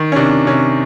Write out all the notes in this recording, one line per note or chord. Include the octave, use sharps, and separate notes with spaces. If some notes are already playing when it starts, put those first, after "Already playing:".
Already playing: D#3
C#4
C3 D4
C3 C#4